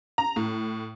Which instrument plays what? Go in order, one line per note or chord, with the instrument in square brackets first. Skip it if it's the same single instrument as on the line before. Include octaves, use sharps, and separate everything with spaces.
[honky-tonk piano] A#5
A2